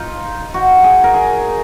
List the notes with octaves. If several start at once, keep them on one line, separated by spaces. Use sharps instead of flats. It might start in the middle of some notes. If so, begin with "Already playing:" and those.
Already playing: D#4 F4
F#4
G#4
A#4
G#4